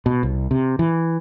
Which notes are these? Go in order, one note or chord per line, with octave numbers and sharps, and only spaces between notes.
B2
C2
C3
E3